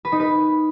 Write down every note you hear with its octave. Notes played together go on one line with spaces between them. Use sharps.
B4
D#4
B4